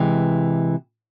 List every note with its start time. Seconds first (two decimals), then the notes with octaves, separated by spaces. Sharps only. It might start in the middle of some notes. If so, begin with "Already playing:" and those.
Already playing: C3 E3 G#3